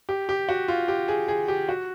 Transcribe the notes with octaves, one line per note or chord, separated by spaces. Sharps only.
G4
G4
F#4
F4
G4
G#4
G#4
G4
F#4